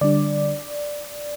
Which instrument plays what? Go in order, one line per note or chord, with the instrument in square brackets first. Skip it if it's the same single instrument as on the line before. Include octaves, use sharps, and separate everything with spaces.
[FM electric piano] D3 G3 D4 D5